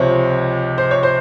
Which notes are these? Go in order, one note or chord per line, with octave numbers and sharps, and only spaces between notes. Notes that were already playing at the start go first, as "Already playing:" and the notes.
Already playing: C#2 C3 F3 C#5
C5
C#5
C5